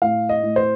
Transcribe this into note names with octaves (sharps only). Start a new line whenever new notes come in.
A2 F5
D#5
A2
C5